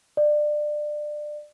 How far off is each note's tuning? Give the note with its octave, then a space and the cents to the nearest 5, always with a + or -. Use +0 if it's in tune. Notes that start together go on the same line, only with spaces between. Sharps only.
D5 +25